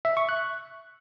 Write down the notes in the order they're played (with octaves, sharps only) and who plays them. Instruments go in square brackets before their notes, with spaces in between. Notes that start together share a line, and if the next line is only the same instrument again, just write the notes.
[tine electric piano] E5
C#6
F#6